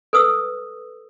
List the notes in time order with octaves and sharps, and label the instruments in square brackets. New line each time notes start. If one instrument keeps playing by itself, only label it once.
[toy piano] A4 B4 D#6 E6